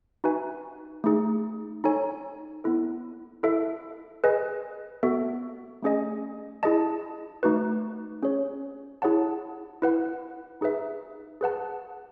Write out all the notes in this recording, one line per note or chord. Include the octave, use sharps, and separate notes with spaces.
D#4 F#4 B4 E5 G#5
A3 D#4 G#4
D#4 A4 C#5 G#5
B3 E4 A4
E4 A4 E5
G#4 B4 D#5 G#5
B3 F#4 A4 E5
A3 C#4 G#4 D#5 G#5
E4 G#4 D#5 A5
A3 D#4 F#4 B4
C#4 G#4 C#5
E4 G#4 C#5 F#5 A5
E4 B4 F#5
D#4 G#4 B4 E5
G#4 B4 F#5 A5